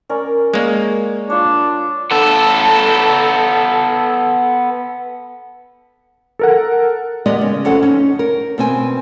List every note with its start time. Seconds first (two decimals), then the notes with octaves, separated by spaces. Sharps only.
0.09 C#4 A#4 D5
0.54 G#3 A#3 C#5 D5
1.30 D4 F4 C#5
2.11 B3 A4
6.39 A4 A#4 F#5
7.26 G#3 B3 G4 A#4 D5 D#5
7.41 C#3
7.65 F2 C#4 A4 F#5
7.83 C#4 D#4
8.19 A#4
8.58 B2 C4 G#5